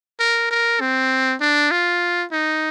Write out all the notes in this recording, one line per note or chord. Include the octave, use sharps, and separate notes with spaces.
A#4
A#4
C4
D4
F4
D#4